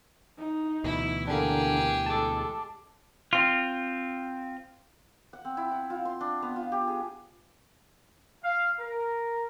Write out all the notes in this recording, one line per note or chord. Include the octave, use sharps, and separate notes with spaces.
D#4
D2 B2 E3 E4
D3 A#3 D4 G4 G#4 A#4
G#3 A4 A5 D6
C4 F4
F#5
C4
E4
F#5
F4
C6
D4
B3
F4
G4
G#4
F5
A#4